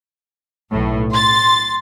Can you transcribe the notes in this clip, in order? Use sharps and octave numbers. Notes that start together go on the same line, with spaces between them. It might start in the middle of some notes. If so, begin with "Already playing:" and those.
B1 A2
C6 A6